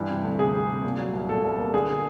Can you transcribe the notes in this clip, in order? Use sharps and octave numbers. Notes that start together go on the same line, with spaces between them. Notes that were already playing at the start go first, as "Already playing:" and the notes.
Already playing: G2 E3
C3
D2
C3 G#4
C3
C3
A#2
F#3
C2
A#2 A4
C2
A#3
D3 G#4
D3